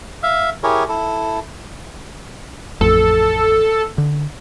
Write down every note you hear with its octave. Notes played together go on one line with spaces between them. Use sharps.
E5 F5
E4 G4 G#4 A#4 C#5
E4 A4
A1 F2 A4
D3